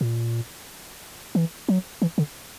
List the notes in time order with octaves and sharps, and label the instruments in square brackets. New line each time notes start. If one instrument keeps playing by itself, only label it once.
[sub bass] A#2
E3
F#3
E3
D3